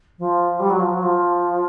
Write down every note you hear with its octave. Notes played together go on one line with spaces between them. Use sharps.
F3
G3
F#3
F3
F#3
F3